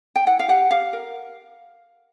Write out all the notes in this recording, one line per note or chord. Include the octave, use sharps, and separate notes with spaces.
G5
E4 F#5
F5
G4 F#5
G4 F5
A#4